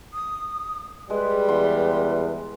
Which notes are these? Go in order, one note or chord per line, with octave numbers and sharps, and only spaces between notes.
D#6
G3 G#3 B4
E2 C6